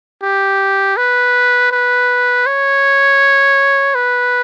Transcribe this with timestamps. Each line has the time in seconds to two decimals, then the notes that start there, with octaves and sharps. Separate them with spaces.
0.22 G4
0.97 B4
1.71 B4
2.46 C#5
3.95 B4